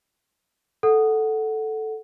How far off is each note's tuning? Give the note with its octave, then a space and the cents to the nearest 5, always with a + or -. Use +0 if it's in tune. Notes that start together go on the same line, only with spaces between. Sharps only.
A4 -5 F#5 +0